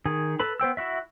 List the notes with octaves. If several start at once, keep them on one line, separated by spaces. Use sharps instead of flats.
D#3 G#4
A4 B4 B5
B3 C5 G5 E6
E4 F#4 E5